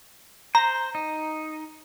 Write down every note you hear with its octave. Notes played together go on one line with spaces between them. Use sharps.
C5 A#5
D#4